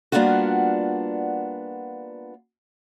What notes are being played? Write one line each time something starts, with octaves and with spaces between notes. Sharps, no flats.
G3 A#3 B3 D4 F4 F#4